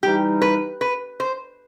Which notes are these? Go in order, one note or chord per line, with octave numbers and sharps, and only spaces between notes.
E3 G3 D#4 G4
B4
B4
C5